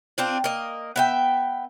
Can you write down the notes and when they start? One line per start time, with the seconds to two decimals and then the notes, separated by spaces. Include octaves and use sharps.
0.18 C4 D4 F4
0.44 A#3 D#5
0.96 B3 E5 G5